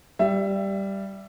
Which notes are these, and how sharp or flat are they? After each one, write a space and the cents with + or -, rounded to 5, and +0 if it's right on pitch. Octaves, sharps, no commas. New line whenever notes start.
G3 +0 E5 +20